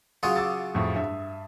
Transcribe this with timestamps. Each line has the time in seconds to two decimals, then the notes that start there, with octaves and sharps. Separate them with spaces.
0.23 C#3 F#3 F4 D#6
0.36 D6 E6 A6
0.75 F2 A2
0.95 G2 E5